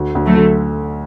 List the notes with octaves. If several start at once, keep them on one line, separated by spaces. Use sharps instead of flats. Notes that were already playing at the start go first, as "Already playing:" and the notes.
Already playing: D2
D2
F#3 A3
D3